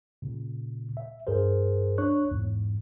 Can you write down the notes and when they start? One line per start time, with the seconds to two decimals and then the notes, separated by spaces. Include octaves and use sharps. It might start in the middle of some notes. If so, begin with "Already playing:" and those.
0.22 A#2 C#3
0.97 E5
1.27 G2 G#4 A#4 C5
1.98 D4 C#5 C#6 F#6
2.31 E2 G#2